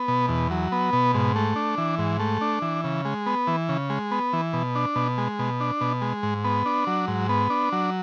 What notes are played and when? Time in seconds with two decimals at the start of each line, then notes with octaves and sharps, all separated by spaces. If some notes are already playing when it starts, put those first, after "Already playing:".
Already playing: B3
0.08 B2
0.28 E2
0.51 F#3
0.72 B3
0.93 B2
1.14 G#2
1.36 A3
1.56 D4
1.78 E3
1.98 G#2
2.19 A3
2.41 D4
2.62 E3
2.84 C#3
3.05 G#3
3.26 B3
3.47 E3
3.69 C#3
3.90 G#3
4.11 B3
4.33 E3
4.53 B2
4.75 D4
4.96 B2
5.18 G#3
5.39 B2
5.60 D4
5.81 B2
6.02 G#3
6.23 G#2
6.44 B3
6.66 D4
6.87 F#3
7.08 G#2
7.29 B3
7.50 D4
7.72 F#3